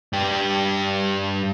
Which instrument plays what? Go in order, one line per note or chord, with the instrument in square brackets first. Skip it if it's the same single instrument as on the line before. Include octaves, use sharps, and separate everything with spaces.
[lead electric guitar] G2 G4